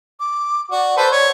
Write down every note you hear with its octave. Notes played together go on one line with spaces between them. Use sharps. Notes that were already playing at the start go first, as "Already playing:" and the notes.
D6
F#4 D5
A4 B4 C5
C#5 D5